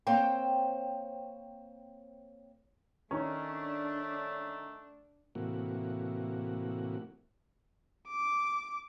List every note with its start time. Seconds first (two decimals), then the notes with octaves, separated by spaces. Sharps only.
0.07 A#3 C4 C5 C#5 G5
3.11 D#3 A3 C#4 D4
5.35 A2 C3 E3 A#3 F#4
8.08 D6